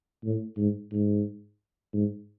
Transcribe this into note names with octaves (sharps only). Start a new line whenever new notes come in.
A2
G#2
G#2
G#2